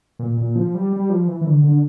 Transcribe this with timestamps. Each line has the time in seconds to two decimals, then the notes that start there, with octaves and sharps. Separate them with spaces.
0.19 A#2
0.38 A#2
0.56 F3
0.75 G3
0.93 G3
1.10 F3
1.28 E3
1.41 E3
1.46 D3
1.64 D3